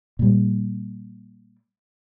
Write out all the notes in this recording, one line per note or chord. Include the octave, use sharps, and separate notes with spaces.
A#2 G3